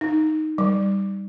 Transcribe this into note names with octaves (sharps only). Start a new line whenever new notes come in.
D#4
G3